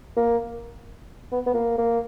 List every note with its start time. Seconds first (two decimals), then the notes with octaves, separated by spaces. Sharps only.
0.17 A#3
1.32 B3
1.46 B3
1.54 A#3
1.78 A#3